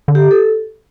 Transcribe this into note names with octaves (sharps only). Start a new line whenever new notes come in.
D3
G4
A4